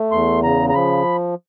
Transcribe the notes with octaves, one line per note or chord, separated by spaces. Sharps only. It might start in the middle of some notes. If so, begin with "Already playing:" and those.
Already playing: A3
E2 C6
C#3 A#5
A#5
F3 B5